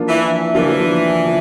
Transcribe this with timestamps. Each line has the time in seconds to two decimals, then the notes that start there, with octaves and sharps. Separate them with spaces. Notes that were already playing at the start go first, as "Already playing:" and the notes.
Already playing: F3 A#3 D4 F4
0.09 E3
0.55 E3 F3 A#3 D4 F4
1.25 F3